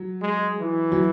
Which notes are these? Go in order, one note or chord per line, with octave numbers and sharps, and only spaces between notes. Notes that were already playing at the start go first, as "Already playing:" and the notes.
Already playing: F#3
G#3
E3
F#3